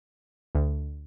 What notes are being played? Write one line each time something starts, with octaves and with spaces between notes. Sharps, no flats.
D2